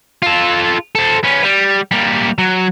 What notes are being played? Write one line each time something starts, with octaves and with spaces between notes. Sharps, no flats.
F4 A4
A4 C5
B3 C#4
G3
G3 A#3
F#3